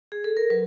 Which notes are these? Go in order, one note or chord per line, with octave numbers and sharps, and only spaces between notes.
G#4
A4
A#4
F#3 B4